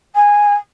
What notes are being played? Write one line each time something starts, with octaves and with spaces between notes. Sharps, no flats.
G#5